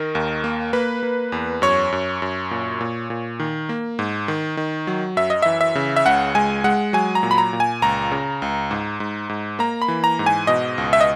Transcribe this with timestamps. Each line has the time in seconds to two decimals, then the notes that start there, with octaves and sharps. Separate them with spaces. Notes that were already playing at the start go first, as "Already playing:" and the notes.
Already playing: D#3 A#4
0.15 D#2
0.44 A#3
0.73 A#3 B4
1.03 A#3
1.32 E2
1.62 F#2 C#5
1.92 F#2
2.22 F#2
2.51 A#2
2.81 A#2
3.10 A#2
3.40 D#3
3.69 A#3
3.99 G#2
4.28 D#3
4.57 D#3
4.87 F#3
5.17 F#2 E5
5.30 D#5
5.42 E3 E5
5.61 E5
5.75 C#3
5.96 E5
6.06 C#2 F#5
6.35 G#3 G#5
6.64 G#3 F#5
6.93 F#3 G#5
7.15 A#5
7.23 A#2
7.31 B5
7.38 A#5
7.53 A#2
7.60 G#5
7.82 C#2 A#5
8.12 C#3
8.42 C#2
8.71 G#2
9.00 G#2
9.29 G#2
9.59 A#3 A#5
9.82 B5
9.88 E3
10.04 A#5
10.19 G#2
10.26 G#5
10.47 B2 D#5
10.78 C#2
10.93 E5
11.01 D#5